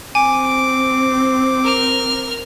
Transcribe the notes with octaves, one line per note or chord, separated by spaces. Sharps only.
C4 G#5 D6
A#4 F6